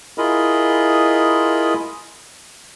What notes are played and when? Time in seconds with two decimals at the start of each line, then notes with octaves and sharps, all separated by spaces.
0.18 E4 F4 G#4 A#4 D#5 B5